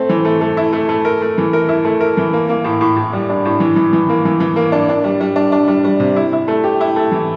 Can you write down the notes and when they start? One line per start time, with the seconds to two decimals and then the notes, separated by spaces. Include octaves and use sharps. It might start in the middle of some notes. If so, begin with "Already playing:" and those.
Already playing: A3 C4
0.09 E3
0.25 A3
0.41 A3
0.57 E4
0.73 A3
0.89 A3
1.05 A#4
1.22 A3
1.38 E3
1.53 A#4
1.69 E4
1.85 A3
2.01 A#4
2.17 E3
2.33 A#3
2.49 A#3
2.64 A2
2.81 A2
2.96 A2
3.13 G3
3.29 D4
3.45 A2
3.60 E3
3.76 E3
3.93 E3
4.09 A#3
4.25 E3
4.40 E3
4.56 A#3
4.72 D4
4.89 D4
5.04 G3
5.21 G3
5.36 D4
5.52 D4
5.68 G3
5.85 G3
6.00 C3
6.16 E4
6.33 E4
6.48 A3
6.64 G4
6.81 E4
6.96 A3
7.12 E3